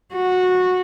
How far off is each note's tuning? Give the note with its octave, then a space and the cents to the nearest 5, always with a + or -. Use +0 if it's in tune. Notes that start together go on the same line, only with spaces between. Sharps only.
F#4 -15